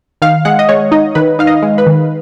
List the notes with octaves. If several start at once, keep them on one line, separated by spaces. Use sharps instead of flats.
D#3 F5
G#3 F#5
D#5
G#3 C#5
D#4 D#5
D#3 B4
D#4 F5
D#5
G#3
B4
D#3